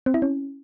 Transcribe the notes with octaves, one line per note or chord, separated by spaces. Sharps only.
C4
E4
C#4